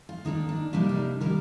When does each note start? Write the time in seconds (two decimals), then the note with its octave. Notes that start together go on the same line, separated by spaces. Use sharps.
0.09 F4
0.25 D#3 A#3 D4 D#4
0.49 D4
0.73 C3 G3 A#3 D4 D#4
0.89 D#4
1.21 D#3 G3 A#3 A#4